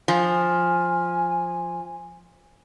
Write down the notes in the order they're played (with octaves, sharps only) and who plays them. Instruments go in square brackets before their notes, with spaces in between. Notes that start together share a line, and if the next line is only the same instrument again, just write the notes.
[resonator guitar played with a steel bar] F3 [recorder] G#5